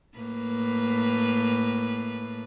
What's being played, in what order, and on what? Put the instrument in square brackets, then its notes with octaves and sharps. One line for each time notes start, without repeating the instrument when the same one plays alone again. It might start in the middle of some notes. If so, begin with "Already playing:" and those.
[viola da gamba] A2 A#3 B4